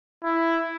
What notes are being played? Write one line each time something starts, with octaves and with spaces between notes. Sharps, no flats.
E4